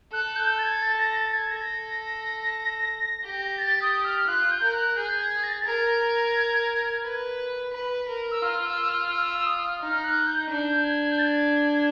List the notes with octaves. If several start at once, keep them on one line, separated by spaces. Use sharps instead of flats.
A4 F#6
G6
A6
G#6
A6
A#6
A6
G#6
A4 A#6
G4
A6
D#6
F6
F4 F#6
G6
A#4
F#6
G#4 G6
G#6
A#6
A6
A#4 G#6
B4
B4
A#4
E6
F4 F6
E6
F6
E6
E6
D#6
F6
D#4 F6
F#6
G6
D4 G6
G#6
G6
A6
G#6